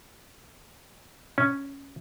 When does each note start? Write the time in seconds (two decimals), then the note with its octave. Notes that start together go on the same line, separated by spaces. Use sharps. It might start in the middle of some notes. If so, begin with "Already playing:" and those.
1.38 C#4